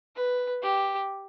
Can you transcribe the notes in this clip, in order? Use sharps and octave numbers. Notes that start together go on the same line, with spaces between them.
B4
G4